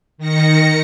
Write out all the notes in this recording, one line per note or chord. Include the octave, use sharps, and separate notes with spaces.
D#3 A#6 C#7